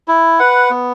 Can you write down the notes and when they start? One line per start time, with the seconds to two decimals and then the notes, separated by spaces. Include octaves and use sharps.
0.08 E4
0.39 B4 F#5
0.70 B3